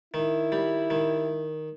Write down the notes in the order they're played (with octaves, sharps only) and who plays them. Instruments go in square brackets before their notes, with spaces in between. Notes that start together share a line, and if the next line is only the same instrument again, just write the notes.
[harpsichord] D#3 [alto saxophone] E4
[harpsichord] G3
D#3